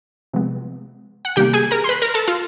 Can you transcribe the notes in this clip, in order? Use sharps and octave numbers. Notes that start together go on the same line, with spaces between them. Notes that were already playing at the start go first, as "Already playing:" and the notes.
C3 F3 G#3 B3
F#5
C3 D#3 G3 A#3 G4 G5
G#4 G#5
A#4 A#5
C6
B4 B5
A#4 A#5
A4 A5
F4 F5